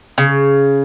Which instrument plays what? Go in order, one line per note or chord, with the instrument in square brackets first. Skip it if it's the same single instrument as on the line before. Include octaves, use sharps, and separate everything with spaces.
[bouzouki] C#3